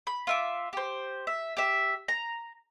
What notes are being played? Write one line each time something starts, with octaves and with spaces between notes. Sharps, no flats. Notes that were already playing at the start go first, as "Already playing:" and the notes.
B5
F4 E5 D6
G4 C5
E5
G4 E5
A#5